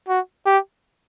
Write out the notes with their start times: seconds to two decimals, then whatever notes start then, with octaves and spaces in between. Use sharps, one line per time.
0.08 F#4
0.46 G4